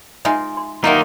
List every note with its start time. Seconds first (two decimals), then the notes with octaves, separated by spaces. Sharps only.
0.25 G#3 D#4 F4 E5 G#5
0.57 C6
0.84 D#3 F#3 A#3 D#4 F4 D#5 E5